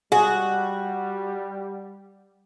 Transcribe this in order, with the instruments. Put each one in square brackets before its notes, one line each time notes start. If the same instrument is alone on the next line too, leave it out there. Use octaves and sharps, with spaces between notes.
[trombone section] G3 [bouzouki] F#4 [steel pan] G#4